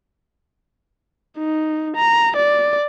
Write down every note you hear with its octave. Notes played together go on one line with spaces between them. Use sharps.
D#4
A#5
D5